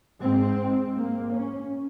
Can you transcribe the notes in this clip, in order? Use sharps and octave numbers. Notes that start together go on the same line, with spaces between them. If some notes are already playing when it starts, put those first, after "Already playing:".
G#2 C4
A#3
C#4